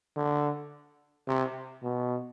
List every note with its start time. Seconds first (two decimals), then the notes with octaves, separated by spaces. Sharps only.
0.17 D3
1.28 C3
1.84 B2